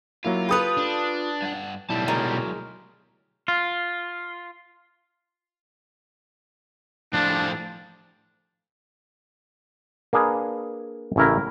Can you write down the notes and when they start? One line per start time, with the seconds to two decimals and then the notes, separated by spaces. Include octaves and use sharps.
0.25 F#3 A#3 E4 F4
0.49 G4 A4 B4 B5 D#6
0.77 D4
1.42 G2 F#5
1.90 B1 G#2 G3 E4 A5
2.08 D2 F#3 G#3 A#4
3.48 F4
7.13 A2 F3 D4 C5
10.13 A#3 D4 G#4 B4
11.16 A1 C#3 E4 A#4